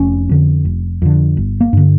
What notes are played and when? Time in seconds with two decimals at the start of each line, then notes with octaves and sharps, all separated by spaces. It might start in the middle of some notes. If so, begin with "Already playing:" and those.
Already playing: F1 C#4
0.29 F2 D3
0.65 F1
1.02 F2 D3
1.37 G1
1.61 A#3
1.73 G2 D3